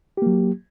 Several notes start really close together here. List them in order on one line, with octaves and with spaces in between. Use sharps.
G4 A#3 F#3